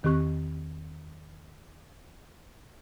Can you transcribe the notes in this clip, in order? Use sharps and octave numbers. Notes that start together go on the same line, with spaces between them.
E2 D#3 C4 G4 C#6 F#6